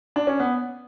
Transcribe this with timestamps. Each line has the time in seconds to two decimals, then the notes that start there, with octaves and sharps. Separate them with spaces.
0.16 D4
0.27 C#4
0.40 B3